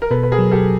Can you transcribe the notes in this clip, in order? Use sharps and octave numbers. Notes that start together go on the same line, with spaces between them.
A#4
B2 A4 B4
B4
G#4 A#4
F#3
G4 A4